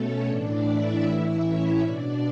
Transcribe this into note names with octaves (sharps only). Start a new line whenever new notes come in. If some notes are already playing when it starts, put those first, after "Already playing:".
Already playing: B2 A3 C#4 A4 C#5
A2 E3 D4 D5
E4 E5
A2 E3
C#4 C#5
B2 D4 D5